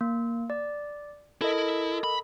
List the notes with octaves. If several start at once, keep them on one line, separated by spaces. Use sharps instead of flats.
A#3
D5
E4 A4 A#4 D#5
B5